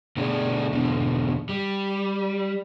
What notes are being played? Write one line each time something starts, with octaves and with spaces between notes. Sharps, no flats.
B2 D3 A3 G#4 D5
E2 B2 D3
G3